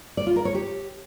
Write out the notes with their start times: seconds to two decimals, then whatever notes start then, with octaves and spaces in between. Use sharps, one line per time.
0.17 D5
0.27 F4
0.36 A#4
0.45 C#5
0.55 G4